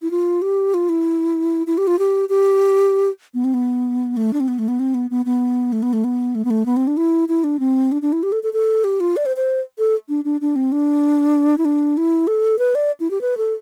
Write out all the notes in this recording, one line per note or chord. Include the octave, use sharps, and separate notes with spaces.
E4
F4
G4
F4
E4
E4
G4
F4
G4
G4
B3
C4
B3
A3
D4
C4
B3
A3
B3
C4
B3
B3
B3
A3
B3
A3
B3
A3
B3
A3
B3
C4
D4
E4
E4
D4
C4
D4
D4
E4
G4
A4
A4
A4
G4
F4
D5
C5
C5
A4
D4
D4
D4
C4
D4
E4
D4
E4
A4
B4
D5
E4
G4
B4
A4